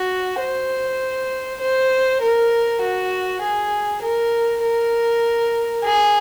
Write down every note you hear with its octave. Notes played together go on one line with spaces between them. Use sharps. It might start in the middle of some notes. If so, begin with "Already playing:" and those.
Already playing: F#4
C5
C5
A#4
F#4
G#4
A#4
A#4
G#4